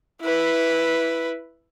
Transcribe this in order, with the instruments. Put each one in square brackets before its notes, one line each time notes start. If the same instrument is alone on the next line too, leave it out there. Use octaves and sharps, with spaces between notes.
[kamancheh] E4 B4